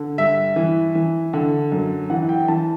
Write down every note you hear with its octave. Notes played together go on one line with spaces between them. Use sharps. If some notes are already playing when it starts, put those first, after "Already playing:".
Already playing: D3
G2 E5
E3
E3
D3
F#2
E3 F#5
G5
E3 A5